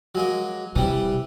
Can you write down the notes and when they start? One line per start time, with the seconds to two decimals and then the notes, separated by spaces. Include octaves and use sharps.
0.15 F#3 G#3 A#3
0.76 C3 E3 G3